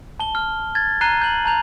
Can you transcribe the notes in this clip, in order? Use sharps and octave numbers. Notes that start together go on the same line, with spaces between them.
A5 G7
F6
G#6 A6
A#5 F#6 C7 D#7 G7
G6 F#7
A5 A#5 G6 F7